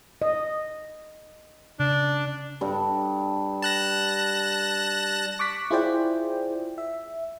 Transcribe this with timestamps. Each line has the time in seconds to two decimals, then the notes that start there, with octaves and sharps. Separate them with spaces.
0.22 D#5
1.80 C#3 D4
2.61 G2 G3 A4
3.63 A5 F#6 A#6
5.39 C#6 D6 F#6 B6
5.71 E4 F4 G#4 C5 D5 G5
6.78 E5